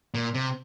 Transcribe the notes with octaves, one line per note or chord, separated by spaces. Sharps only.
A#2
C3